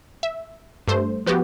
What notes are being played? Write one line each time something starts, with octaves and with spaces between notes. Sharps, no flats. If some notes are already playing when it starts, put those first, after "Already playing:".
E5
G2 A3 C5
F3 B3 F#4 G4